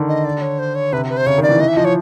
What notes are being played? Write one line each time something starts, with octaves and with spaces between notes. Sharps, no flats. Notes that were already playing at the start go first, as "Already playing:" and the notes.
Already playing: D3 D#3
D#5
D5
C#5
C5
C#5
C3 B4
B4
C5
C#3 C#5
D#3 D5
E3
E3 D#5
E5
F3 D#5
C#5